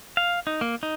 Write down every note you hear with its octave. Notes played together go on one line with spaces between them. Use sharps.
F5
D#4
A#3
D#4